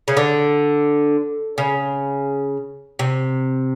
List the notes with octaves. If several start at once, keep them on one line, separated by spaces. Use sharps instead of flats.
C#3
D3
C#3
C3